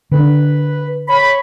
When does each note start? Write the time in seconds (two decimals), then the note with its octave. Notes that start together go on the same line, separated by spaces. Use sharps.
0.11 D3 C#4 D4 B4
1.08 C#5 B5